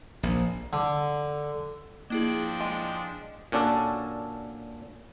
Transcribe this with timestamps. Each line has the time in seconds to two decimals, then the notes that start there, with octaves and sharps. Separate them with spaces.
0.23 A#1
0.73 D3
2.10 F3 A#3 D4 E4 G#4 D#5 G5
2.60 G#3
3.52 A#2 C#4 D4 F#4 A4